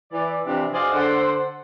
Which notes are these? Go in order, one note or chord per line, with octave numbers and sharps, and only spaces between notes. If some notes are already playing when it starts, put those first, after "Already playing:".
E3 D5
C3 E3 F3 C4 D4
F#4 G#4 C5 D5 D#5 F5
D3 C5 F#5